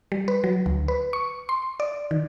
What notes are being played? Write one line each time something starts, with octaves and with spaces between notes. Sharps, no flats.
G3
B4
F#3
D2
B4
C#6
C6
D5
D#3